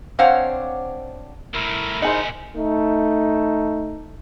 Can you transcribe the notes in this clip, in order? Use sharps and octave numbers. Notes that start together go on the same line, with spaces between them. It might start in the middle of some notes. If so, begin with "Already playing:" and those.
C4 D4 C5 C#5 F5 F#5
C2 A2 E4 A#4
A#2 D#4 G#4 C5 D#5 E5 F#5 G#5
A3 D#4